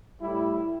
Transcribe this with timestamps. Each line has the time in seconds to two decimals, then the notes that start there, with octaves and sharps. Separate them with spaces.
0.21 A2 G3 E4